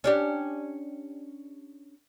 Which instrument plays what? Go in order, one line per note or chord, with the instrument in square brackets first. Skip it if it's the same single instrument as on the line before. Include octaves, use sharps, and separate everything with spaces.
[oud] C#4 D4 G4